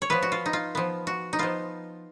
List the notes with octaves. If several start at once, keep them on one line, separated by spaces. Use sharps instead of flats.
C#5
F3 B3 B4
F#4
F4
D#4
F4
F3 B3
F#4
D#4
F3 B3 F4